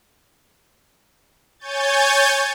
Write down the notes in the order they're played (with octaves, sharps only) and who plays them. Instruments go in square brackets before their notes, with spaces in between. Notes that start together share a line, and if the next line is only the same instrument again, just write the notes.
[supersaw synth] C#5 G#5 G6 A6